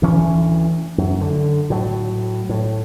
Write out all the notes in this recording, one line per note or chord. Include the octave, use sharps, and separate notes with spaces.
D2 E3 C#4
F#2
D3
A2 F#3
A2